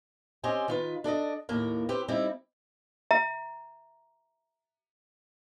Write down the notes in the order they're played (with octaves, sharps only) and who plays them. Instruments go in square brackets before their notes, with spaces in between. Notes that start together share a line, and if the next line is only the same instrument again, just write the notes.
[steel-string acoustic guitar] C4 C#4 G4 C5 D#5 G#5
D#3 F4 B4
D4 A4 D5 D#5
D#2 A2 A#3 A#4
C4 G4 B4 C5
G3 C4 D#4 E4
[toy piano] E5 A#5